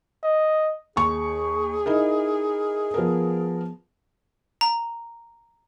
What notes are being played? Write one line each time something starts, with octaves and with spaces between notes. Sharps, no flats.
D#5
D#2 G#4 C#6
D#4 E4 A#4
F3 B3 A#4
A#5